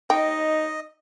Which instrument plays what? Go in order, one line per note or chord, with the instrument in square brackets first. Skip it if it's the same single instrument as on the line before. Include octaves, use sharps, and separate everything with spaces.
[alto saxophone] D#4 [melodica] D#5 [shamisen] G5